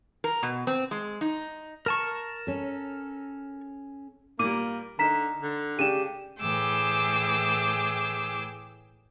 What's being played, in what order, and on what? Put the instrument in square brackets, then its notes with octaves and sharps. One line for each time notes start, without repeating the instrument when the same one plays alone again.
[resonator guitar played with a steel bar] A#4
B2
C4
G#3
D#4
[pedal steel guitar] A#4 A5 C#6
[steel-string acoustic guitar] C#4 A4
[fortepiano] A#2 G3 [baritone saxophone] A#3 [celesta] D6 D#7
[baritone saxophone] D3 [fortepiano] D#4 A#4 [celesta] A#5 B6 E7
[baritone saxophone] D3
[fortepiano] C#3 D4 [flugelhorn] G4 [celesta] D#7 E7
[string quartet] A2 E3 G#4 G5 D6 E6